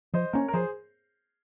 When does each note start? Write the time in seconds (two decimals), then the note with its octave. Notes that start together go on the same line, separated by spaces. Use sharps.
0.14 F3 C5 D#5
0.33 A#3 C#4 A#4 C#5
0.48 A#4
0.53 F3 G#4 C5